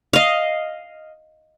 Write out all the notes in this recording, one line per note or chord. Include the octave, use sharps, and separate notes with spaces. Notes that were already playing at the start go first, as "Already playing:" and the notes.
D#5 F5